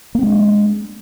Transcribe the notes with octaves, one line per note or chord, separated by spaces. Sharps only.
G#3 A#3 C4 D4